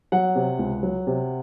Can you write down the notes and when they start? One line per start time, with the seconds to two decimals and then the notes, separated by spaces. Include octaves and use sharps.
0.12 F#3 F#5
0.35 C3
0.59 C#2
0.83 F#3
1.07 C3